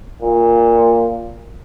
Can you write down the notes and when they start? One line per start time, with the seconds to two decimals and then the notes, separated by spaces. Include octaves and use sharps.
0.22 A#2